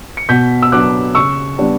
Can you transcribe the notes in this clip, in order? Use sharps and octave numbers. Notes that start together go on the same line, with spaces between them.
C#7
B2 G6 B6
E6
F#3 B3 D4 D6 F#6
C#3 C#6 E6
G3 B3 D4